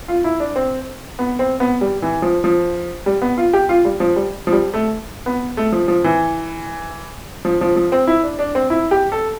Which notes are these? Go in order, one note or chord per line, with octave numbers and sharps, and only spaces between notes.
F4
E4
D4
C4
B3
C4
B3
G3
E3
F3
F3
G3
B3
F4
G4
F4
G3
F3
G3
F3
G3
A3
B3
A3
F3
F3
E3
F3
F3
F3
C4
E4
D4
D4
C4
E4
G4
A4